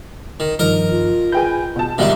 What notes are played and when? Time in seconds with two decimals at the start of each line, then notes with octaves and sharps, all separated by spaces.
0.40 D#3
0.59 G2 D#3 F3 A#4 D#5
0.91 F4
1.32 G#4 B4 G5 G#5 G6
1.76 B2 A5
1.98 A#1 G#2 B2 D#3 G3 D4 E5